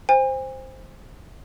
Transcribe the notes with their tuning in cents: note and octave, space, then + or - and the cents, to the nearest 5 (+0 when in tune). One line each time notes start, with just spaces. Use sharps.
C5 +0 G#5 -40